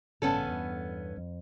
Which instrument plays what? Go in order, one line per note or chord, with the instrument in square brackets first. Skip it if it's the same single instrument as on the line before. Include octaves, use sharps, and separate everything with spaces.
[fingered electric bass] A1 G2 C#3 [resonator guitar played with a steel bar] B3 C#4 A4
[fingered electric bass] E2 G2
F2